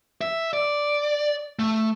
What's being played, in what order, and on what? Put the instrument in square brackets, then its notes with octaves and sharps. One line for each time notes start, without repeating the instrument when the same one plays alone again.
[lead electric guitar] E5
D5
A3